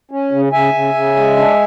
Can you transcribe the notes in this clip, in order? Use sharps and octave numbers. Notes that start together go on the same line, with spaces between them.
C#4
C#3
C#3 E5 G#5
C#3
C#3
G#3
D4